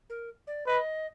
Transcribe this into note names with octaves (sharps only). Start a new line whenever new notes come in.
A#4
D5
B4 D#5